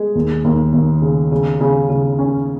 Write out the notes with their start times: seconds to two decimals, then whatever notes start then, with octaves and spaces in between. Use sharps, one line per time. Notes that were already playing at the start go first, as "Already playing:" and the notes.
Already playing: G#3 G#4
0.15 D#2
0.44 D#2
0.73 D#2
1.02 C#3
1.32 C#3
1.61 C#3
1.90 C#3
2.19 C#4